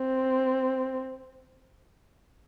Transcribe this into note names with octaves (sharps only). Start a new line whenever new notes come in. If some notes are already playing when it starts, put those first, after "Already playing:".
Already playing: C4